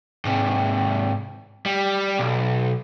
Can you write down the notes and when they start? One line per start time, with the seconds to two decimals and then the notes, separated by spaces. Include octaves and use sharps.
0.25 G#2 C3
1.66 G3
2.18 B1